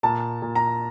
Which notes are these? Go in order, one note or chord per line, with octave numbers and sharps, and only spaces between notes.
A#2 A5
A#2
A#5